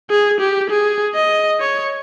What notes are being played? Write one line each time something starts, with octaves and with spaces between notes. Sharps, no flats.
G#4
G4
G#4
D#5
C#5